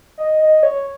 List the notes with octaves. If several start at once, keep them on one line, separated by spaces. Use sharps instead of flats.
D#5
D#5
C#5